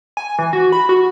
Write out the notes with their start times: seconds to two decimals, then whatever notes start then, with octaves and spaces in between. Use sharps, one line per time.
0.17 G#5
0.39 E3
0.53 F#4
0.72 B5
0.89 F#4